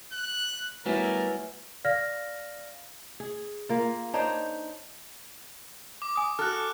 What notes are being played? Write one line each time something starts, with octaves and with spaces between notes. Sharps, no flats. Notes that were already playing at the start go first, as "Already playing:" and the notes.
F#6
F#3 G3 A3 B3 E4 A#4 B4 G#5
D5 F5 F6 A#6
G#4
A#3 F4
D4 D#4 C5 C#5
D6
G#5 D#6
F#4 A4 F6 F#6